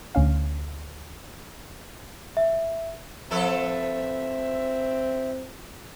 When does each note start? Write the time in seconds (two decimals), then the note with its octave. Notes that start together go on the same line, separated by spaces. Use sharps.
0.15 D2 C#4 F5
2.37 E5
3.31 F3 C4 A4 B4 E5